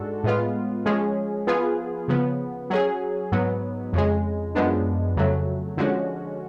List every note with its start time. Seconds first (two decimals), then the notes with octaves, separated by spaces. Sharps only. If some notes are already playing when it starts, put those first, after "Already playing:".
Already playing: G#2 G#3 D4 F#4 A4
0.24 A2 G#3 B3 F4
0.86 F3 G#3 C#4 G#4
1.47 F3 B3 F4 G#4
2.08 C#3 F3 B3
2.70 F#3 C#4 G#4
3.32 G#2 F#3 B3
3.93 F2 C#3 G#3
4.55 F#2 F3 G#3 B3 D4
5.17 F2 C#3 F#3 A3
5.77 D3 F3 G#3 C#4 F#4